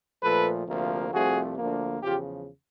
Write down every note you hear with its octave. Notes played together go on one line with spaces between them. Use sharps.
A#2 F3 A3 A4 B4
D2 C3 F3 A#3
C2 C3 F3 A3 F#4 G#4
D2 D3 F3 A#3
E2 C#3 F3 F4 G4